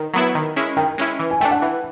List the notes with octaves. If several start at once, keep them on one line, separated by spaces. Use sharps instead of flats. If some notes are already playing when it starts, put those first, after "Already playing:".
Already playing: D#3
F#3 B3 E4
D#3
G#3 C#4 E4
D#3 G5
G#3 C#4 E4
E3
G#5
A3 D4 G5
F#5
E3